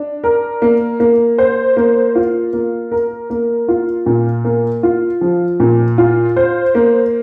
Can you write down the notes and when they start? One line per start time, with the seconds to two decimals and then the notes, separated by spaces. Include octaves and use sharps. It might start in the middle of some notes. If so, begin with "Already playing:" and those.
Already playing: D4
0.24 A#4
0.62 A#3
1.00 A#3
1.38 C5
1.77 A#3
2.15 F4
2.53 A#3
2.91 A#4
3.30 A#3
3.68 F4
4.06 A#2
4.45 A#3
4.83 F4
5.21 F3
5.60 A#2
5.98 F4
6.36 C5
6.75 A#3